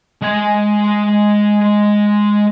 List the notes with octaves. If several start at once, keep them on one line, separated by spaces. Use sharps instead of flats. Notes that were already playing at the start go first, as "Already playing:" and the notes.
G#3 G#5